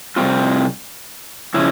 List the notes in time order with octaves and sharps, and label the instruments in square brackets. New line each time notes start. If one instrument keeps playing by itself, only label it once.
[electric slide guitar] C3 G3 C4 F4
C#3 F3 C#4 E4